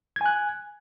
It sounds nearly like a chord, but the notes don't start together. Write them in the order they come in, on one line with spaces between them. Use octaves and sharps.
G#6 G#5 F#6